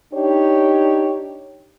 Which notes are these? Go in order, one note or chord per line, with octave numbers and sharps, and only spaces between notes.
D4 D#4 G4 C#5